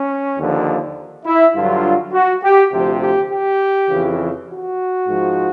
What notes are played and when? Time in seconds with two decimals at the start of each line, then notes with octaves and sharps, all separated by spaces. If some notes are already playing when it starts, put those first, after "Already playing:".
Already playing: C#4
0.37 D#2 D3 F3
1.26 E4
1.55 G2 D3 F#3 F4
2.13 F#4
2.43 G4
2.72 D2 C3 F3 G4
3.01 G4
3.31 G4
3.90 F2 C#3 E3
4.48 F#4
5.07 G#2 F3